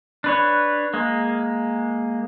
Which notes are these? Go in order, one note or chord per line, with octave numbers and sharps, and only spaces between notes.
D4 B4 C#5
G#3 A#3